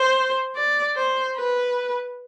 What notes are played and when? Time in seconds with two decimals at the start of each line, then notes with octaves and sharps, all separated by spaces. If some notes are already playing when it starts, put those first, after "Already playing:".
Already playing: C5
0.56 D5
0.96 C5
1.36 B4